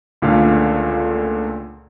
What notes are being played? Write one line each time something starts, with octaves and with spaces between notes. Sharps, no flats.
C#2 A#2 D3 A3 F5